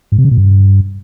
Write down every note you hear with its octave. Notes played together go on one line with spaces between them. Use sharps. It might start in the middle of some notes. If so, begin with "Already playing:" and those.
G#2
C3
C#3
A#2
G2